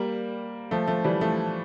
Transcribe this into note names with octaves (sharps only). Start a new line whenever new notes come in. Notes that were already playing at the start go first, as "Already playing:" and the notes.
Already playing: G3 A#3
F3 A3
F3 A3
E3 G3
F3 A3